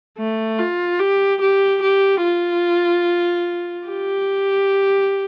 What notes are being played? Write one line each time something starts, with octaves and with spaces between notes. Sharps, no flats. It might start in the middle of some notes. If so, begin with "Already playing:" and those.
A3
F4
G4
G4
G4
F4
G4